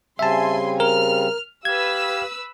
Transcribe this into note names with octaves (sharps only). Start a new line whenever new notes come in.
C#3 G3 C4 E5 G#5 A5 C6
A#4 F6
G4 B4 F5 E6 G#6